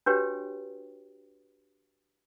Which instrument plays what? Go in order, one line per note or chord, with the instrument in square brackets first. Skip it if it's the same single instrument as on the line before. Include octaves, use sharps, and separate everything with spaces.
[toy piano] D4 F#4 G4 B4 C#5 G5